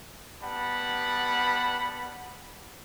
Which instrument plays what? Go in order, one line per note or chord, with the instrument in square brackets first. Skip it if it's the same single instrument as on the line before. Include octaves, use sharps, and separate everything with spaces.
[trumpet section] G3 B3 F#5 A5 B5